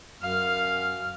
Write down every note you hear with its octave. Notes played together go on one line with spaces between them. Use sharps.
F#2 F5 F6